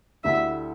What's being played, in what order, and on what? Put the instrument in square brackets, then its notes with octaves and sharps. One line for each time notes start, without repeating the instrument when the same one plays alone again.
[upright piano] D2 D3 A3 E4 G4 [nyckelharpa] E5